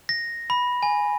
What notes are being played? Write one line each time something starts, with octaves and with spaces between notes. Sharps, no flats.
A#6
B5
G#5